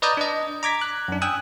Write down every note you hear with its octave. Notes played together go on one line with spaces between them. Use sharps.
B4 D5 D#5 A#5 D#6 G6
D4 D#5
A#5 D6 G#6 B6
F#6
F#2 D4
G5 G#5 D#6 E6 F#6 G#6